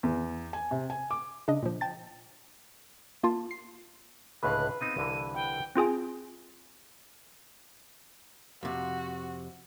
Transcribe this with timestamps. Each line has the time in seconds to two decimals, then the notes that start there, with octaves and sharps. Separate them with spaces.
0.03 E2
0.53 G#5
0.71 C3
0.90 G#5
1.11 D6
1.48 C#3 D4 D#5
1.63 A#2 F3
1.81 G5 A5 A6
3.23 A#3 F4 A5 C6
3.51 C7
4.43 C#2 A2 D3 B4 F5 B5 F#6
4.81 B3 C4 D#4 D#7
4.97 C2 D3 E3
5.35 F#5 G5
5.76 C4 F4 G#4 G#5
8.63 F2 C3 F#4